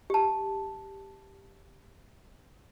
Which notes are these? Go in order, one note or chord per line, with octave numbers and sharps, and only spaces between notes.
G4 A5